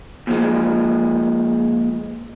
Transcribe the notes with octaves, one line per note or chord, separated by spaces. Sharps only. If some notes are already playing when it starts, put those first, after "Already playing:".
A#2 F3 G#3